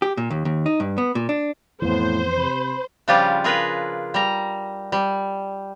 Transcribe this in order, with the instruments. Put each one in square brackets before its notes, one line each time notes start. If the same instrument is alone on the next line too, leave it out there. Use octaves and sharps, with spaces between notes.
[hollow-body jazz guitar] G4
A#2
D#2
D#2
D#4
G2
B3
A#2
D4
[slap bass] F2 E3 [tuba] A2 [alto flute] B3 [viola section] C5
[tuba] C3 [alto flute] B5
[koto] C#3 F3 G3 D4 F4 G4
F4 G#4 A#4 B4
G3 A#5
G3